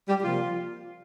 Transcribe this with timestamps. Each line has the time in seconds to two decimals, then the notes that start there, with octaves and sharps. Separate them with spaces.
0.08 G3 G4
0.23 C3 F3 A#3 F4